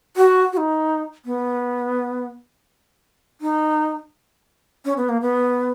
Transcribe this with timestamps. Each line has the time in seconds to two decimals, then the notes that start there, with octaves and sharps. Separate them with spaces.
0.17 F#4
0.53 F#4
0.57 D#4
1.25 B3
3.41 D#4
4.85 C#4
4.97 B3
5.09 A#3
5.21 B3